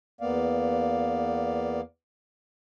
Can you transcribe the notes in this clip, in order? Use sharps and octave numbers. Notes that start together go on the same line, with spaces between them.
E2 A#3 B3 D5 F5